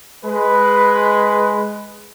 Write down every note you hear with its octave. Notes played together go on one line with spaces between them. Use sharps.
G#3 B4